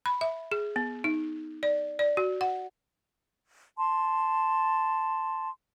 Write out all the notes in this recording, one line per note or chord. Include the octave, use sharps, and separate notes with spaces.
B5
E5
G#4
B3
D#4
D5
D5
F#4
F#5
A5 C6